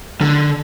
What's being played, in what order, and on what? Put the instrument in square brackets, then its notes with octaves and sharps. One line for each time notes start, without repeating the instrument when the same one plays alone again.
[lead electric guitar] D3